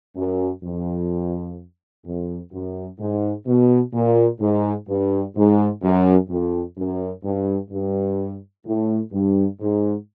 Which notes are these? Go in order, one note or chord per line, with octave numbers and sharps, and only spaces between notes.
F#2
F2
F2
F#2
G#2
B2
A#2
G#2
G2
G#2
F#2
F2
F#2
G2
G2
A2
G2
G#2